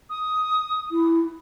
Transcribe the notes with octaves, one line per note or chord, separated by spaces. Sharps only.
D#6
E4